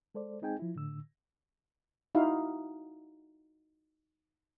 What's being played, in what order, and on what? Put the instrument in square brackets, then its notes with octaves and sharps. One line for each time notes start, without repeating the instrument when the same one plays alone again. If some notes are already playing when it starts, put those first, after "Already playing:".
[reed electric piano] G#3 A4 C5 D5
G#3 C4 D#4 G#4 G5 G#5
F3 E4
A2 D3 E6
[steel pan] D#4 E4 F#4 E5 F5